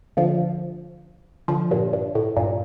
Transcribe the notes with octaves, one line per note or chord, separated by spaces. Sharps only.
D3 F3
D3 F3
G2 A#2
G2
A2
G2 A#2